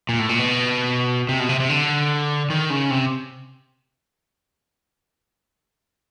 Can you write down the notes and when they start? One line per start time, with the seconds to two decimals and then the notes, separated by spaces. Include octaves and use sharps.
0.09 A#2
0.19 A2
0.29 A#2
0.39 B2
1.29 C3
1.40 B2
1.49 C3
1.60 C3
1.69 D3
2.50 D#3
2.70 C#3
2.91 C3